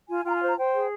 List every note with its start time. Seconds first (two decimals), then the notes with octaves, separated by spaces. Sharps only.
0.09 F4 G#5
0.25 F4 G5
0.30 A#5
0.35 G#5
0.41 C5
0.47 A#5
0.57 C5 G5
0.74 G#4